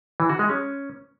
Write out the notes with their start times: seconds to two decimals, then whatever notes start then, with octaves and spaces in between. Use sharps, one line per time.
0.20 E3
0.29 F#4
0.39 G#3
0.49 C#4